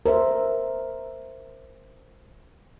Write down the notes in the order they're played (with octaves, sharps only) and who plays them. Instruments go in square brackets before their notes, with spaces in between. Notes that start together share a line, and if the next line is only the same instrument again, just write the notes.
[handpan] A#4 C5 E5